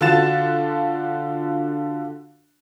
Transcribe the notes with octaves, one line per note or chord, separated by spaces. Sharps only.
D3 D4 F4 F#4 A6 E7